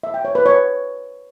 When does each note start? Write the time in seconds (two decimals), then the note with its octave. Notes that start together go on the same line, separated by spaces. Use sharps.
0.04 E5
0.14 G5
0.25 C#5
0.35 B4
0.46 C#5